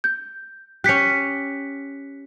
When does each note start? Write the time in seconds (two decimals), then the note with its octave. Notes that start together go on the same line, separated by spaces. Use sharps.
0.04 G6
0.84 C#4 G4 F#6 B6 C#7